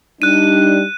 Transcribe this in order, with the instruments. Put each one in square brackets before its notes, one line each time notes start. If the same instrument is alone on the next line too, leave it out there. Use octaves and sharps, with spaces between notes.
[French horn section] G3 D4 D#4 [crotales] F#6 D#7